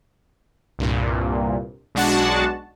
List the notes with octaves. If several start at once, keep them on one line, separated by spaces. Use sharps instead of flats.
C2 G2 A#2
B1 G#3 D4 F#4 F#5 A5